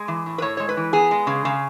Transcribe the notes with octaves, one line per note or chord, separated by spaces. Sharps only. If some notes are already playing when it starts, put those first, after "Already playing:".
Already playing: G#3
E3
A2
B4
A2 C#5
G#3 C#5
B4
E3
B3 G#4
G#3
C#3
C#3